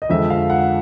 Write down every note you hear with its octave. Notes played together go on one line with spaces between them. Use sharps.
D#5
F2 D3 F3 G#3 E5
F5
F#5